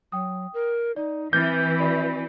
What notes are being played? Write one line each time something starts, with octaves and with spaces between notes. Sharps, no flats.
F#3 G5 D#6
A#4
D#4 D5
E3 C4 D6 F6 G6 A6
F#4 D5 B5